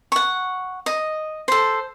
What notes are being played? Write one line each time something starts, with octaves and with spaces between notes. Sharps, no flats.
F#5 C#6
D#5
A4 C5